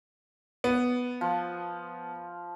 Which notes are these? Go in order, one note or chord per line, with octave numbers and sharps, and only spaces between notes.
B3
F3